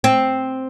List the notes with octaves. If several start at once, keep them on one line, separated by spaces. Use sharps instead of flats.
C4